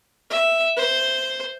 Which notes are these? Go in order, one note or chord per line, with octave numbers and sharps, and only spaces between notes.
E5
C5